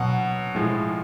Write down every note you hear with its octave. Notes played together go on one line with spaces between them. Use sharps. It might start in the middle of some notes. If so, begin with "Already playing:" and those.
Already playing: B2 F#3 F#5
A2 F3 G#3